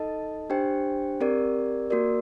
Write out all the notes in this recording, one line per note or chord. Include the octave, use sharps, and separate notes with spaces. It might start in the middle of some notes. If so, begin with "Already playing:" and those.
Already playing: D#4 A4 D#5 A5
D4 G4 C5 G5
C4 G4 A#4 D5
A#3 F#4 A#4 D5